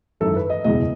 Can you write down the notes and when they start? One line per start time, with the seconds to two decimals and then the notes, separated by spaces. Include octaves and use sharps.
0.20 G#1 F#2 E3 A4
0.36 B4
0.50 D#5
0.64 F#1 E2 B2 G#3 D#5